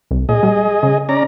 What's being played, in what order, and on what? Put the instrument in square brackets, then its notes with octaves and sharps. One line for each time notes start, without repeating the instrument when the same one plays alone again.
[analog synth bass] C2
[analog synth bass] A#2 [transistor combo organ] G#4 D#5
[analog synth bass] G3
C#3
[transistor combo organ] C#4 D5 A#5